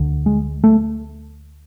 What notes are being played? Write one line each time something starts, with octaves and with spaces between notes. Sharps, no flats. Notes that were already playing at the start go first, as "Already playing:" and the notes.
Already playing: D2 D3
G#3
A3